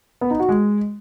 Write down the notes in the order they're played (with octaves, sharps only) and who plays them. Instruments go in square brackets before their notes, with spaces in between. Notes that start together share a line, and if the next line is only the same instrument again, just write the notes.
[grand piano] B3
D#4
F#4
G#3